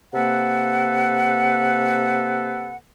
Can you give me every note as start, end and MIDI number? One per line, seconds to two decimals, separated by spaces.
0.14 2.77 48
0.14 2.77 58
0.14 2.77 69
0.14 2.77 71
0.14 2.77 78